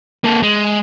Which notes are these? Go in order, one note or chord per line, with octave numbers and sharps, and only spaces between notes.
A#3 A4
G#3